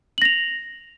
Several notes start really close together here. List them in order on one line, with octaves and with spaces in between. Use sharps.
F#7 A#6 F7